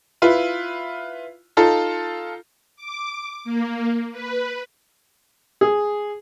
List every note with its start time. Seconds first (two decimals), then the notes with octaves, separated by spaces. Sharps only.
0.22 E4 F4 B4
1.57 D#4 F4 A4
2.76 D6
3.44 A#3
4.12 B4
5.61 G#4